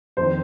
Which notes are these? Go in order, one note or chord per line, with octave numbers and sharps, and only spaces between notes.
F2 D#3 C5